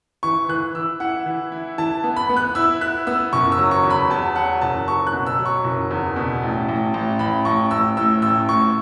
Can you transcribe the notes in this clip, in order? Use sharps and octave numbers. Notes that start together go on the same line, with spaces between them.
E3 C#6
E3 F#6
E3 E6
E4 F#5
E3
E4
E3 A5
B3
B5
B3
F#6
E4 E6
E4 F#6
B3 E6
F#1 C#6
E6
F#3
C#6
E2
B5
E2 A5
F#3 F#5
F#1 A5
F#3 C#6
F#6
B2
E6
F#3
C#6
F#1
E2
B2
A1
A1
A1
A1 B5
A1 C#6
A1 E6
A2 E6
A1 E6
A2 C#6